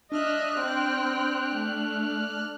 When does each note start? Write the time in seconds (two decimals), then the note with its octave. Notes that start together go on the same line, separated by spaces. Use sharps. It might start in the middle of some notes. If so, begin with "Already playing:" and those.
0.12 D4 D#5 E5 F6 F#6
0.60 C4 G5
1.56 A3